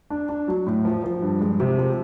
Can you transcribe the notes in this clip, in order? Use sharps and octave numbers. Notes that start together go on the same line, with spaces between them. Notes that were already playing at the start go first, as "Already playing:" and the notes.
D4
D4
F#3
A2
F3
F3
G2
G#3
C3
F3